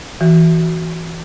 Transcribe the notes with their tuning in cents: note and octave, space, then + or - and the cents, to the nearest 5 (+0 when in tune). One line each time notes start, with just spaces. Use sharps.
E3 +0 F#4 +0